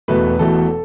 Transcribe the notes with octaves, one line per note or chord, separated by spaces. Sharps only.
E1 E2 B2 A3 B4
E1 E2 B2 A3 A4